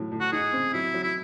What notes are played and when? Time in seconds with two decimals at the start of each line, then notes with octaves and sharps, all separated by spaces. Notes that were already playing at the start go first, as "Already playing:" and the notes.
Already playing: A2 F#3
0.12 A2
0.21 F#4
0.32 D#4 G#4
0.53 C4
0.73 F#3 E4
0.94 F#3
1.03 E4